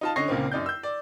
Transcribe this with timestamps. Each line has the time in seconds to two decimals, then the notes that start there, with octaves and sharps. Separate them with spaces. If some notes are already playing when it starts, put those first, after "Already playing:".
0.01 D#4 F4 A5
0.16 D3 C#4 D#5 C#6 A#6 C7
0.28 C#2 A#2 C#3 A#3 C4
0.51 F#2 D#4 D5 G6
0.66 E6 G6
0.83 D5